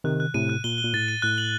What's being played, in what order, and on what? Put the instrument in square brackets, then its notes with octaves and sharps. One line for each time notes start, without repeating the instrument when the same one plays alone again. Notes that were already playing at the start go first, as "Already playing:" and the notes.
[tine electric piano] C3 D#3 [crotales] F#6
[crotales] F#6
[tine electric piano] A2 C3 [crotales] D#7
[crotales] F#6
[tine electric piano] A#2 [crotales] G7
[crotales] G7
[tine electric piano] A#2
[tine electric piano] A2 [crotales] A6
[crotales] D#7
[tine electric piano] A2 [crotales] F#6
[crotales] F#7